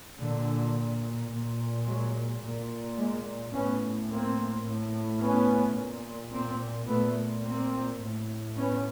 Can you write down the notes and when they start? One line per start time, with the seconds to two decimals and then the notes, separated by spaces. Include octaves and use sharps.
0.19 A#2 D3
1.31 A#2
1.87 F#3 G#3
2.42 A#2
2.97 G#3 A#3
3.54 A2 B3 C#4
4.09 A#3 C4
4.64 A2
5.20 B3 C#4
5.76 A#2
6.32 A#3 C4
6.87 A#2 A3 B3
7.43 A#3 C4
8.00 A2
8.55 B3 C#4